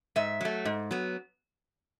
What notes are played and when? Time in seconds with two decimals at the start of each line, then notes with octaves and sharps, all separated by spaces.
0.16 G#2 E5
0.41 F#3 A3
0.65 G#2
0.91 F#3 B3